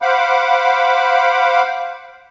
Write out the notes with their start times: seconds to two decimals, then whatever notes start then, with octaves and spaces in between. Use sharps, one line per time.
0.02 C5 F5 F#5 B5 D6